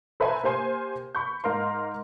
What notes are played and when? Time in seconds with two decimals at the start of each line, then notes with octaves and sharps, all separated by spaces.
0.20 A4 B4 C5 E5 G#5 A#5
0.43 A#3 G4 C5 G#5 C6
1.15 B5 C#6 G6
1.44 G#2 A#4 F5 C6